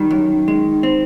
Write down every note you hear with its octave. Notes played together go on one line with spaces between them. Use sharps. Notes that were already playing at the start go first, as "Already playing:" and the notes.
Already playing: D#3 G3
F#2
G#3
C4